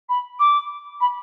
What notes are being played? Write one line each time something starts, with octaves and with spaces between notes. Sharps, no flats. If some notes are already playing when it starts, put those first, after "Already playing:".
B5
D6
B5